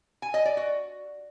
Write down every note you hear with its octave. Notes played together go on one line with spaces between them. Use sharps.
G#5
D#5
D5
F#4